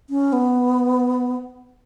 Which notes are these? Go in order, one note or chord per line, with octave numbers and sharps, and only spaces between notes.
C#4
B3